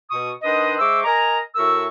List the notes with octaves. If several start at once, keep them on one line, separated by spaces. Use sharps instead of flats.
B2 C#6 D#6
D#3 D4 B4 C5 D#5
G#3 C5 E5 C#6 D6 E6
A#4 D#5 G#5 A#5
A2 F#4 A#4 E5 C#6 E6